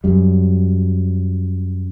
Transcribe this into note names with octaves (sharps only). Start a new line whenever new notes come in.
F#2 G3